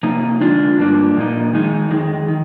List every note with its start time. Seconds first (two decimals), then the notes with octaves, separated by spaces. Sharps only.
0.03 C3 F3 A#3 D#4
0.41 D3 G#3 D4 F4
0.79 G2 F3 A#3 D4
1.16 A#2 F3 A#3 D#4
1.54 D#3 G#3 D#4
1.90 F2 D#3 G#3
2.28 D#3